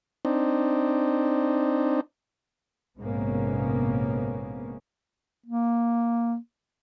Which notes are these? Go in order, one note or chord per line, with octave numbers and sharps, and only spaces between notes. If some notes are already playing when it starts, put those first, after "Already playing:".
C4 D4 D#4
A#1 G#2 C3 A#3 B3 C#4
A#3